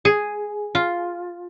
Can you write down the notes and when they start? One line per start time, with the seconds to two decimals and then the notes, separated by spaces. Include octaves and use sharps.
0.05 G#4
0.75 F4